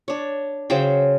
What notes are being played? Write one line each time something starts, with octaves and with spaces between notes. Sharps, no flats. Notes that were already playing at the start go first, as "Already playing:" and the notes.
D4 C#5
C#3 F#3 C5 G5